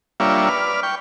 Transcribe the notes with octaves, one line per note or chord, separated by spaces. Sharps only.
G3 A#3 D4 F4 C#5 E5
B4 D5 F6
G5 C#6